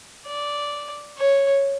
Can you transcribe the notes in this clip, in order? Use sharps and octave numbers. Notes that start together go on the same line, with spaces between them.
D5
C#5